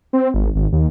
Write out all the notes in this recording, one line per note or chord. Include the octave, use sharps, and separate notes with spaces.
C4
G#1
G#1
D#2